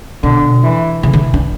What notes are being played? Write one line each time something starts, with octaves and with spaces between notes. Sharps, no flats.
B2 D3
E3
C#3 E3
D3
D4